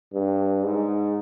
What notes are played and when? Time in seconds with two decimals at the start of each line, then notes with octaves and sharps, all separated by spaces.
0.14 G2
0.64 G#2